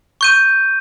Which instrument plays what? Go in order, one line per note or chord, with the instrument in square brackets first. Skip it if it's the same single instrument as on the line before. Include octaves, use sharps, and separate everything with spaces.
[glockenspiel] C#6 G6 D#7